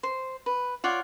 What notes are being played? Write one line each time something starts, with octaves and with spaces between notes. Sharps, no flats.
C5
B4
F4 C#5 D5 F#5